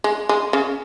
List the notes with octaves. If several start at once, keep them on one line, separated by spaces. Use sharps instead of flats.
G#3
G#3
C#3